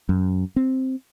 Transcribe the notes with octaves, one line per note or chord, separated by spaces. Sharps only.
F#2
C4